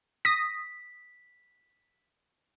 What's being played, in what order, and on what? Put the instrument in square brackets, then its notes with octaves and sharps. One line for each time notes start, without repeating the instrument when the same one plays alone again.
[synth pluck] D#6 A#6 [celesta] B6